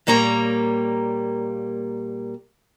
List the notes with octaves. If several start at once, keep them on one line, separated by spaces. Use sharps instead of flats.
A#2 G3 A#3 C#5 A#5